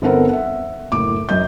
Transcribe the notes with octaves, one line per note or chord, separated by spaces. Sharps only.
G1 B3 C4 A4 A#4 F#5
E5 F#5
F#1 A2 D6
F#2 D#5 G6